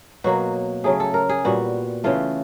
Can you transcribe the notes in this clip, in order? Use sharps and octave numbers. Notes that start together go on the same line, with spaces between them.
B2 F#3 A#3 F#4
C#3 F#3 A3 G#4
A4
A#4
G#4
A#2 G3 B3 F#4
C#3 E3 A3 F4